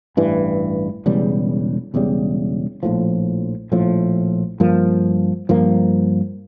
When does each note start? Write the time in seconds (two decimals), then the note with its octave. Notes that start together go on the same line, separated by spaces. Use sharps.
0.17 A1 G2 E3
1.06 E1 E2 C#3 G3
1.94 E1 E2 C#3 G3
2.83 A#1 A2 F3
3.72 A#1 A2 F3
4.60 G2 F3 A#3
5.49 G2 F3 A#3